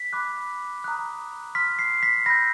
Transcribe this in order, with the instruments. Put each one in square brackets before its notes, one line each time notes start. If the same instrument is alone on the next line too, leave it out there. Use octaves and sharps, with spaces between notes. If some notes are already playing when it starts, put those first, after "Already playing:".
Already playing: [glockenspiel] B6
B5 D6 F#6
A#5 D#6 F#6
C6 F6 B6
C7
B6
B5 E6 G6 A#6